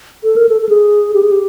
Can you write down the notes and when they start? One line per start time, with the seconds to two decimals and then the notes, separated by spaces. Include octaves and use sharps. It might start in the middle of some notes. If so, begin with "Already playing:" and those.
0.23 A4
0.36 A#4
0.49 A4
0.61 A4
0.69 G#4
1.14 G4
1.23 G#4
1.31 G4